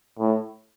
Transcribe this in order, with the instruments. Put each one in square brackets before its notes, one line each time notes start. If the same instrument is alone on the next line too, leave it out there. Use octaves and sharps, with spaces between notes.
[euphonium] A2